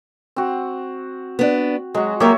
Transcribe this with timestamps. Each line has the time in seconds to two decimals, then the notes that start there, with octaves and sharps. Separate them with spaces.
0.36 C4 F#4
1.39 B3 D4
1.95 F#3 G#3 F#4
2.20 F#3 A#3 F#4 G4 C#5 E5